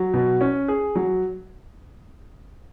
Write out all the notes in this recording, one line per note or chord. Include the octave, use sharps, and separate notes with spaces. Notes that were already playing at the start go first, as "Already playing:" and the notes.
Already playing: F#3
B2
C#4
G#4
F#3